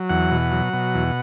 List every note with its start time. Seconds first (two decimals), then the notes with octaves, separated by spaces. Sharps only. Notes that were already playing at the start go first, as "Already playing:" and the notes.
Already playing: F#3
0.09 E2 F#5
0.31 B2
0.52 F#3
0.73 B2
0.94 E2